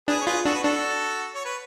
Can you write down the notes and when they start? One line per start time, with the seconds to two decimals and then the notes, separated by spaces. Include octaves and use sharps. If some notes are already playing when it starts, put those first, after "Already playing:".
0.08 D4 G#4 B4
0.21 C#5
0.26 F4 G#4 B4
0.45 D4 F#4 A4
0.55 B4
0.63 D4 F#4 A4
1.35 C#5
1.45 B4